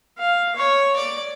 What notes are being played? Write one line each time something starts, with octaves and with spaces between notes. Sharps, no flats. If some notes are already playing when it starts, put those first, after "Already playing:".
F5
C#5
D5